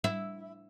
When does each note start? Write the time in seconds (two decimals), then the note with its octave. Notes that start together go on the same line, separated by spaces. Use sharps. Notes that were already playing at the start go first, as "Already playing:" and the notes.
0.04 E4